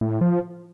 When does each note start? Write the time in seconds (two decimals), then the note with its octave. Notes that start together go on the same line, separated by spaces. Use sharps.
0.01 A2
0.21 F3